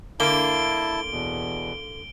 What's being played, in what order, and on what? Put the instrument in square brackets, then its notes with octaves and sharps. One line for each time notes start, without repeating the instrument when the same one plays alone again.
[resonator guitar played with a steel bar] D3 A#3 [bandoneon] E4 A5 [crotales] D7 G7
[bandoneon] E2 B2